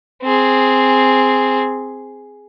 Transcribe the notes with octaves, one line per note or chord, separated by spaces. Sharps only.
C4 G#4